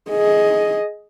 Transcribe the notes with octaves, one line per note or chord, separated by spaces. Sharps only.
G#4 D#5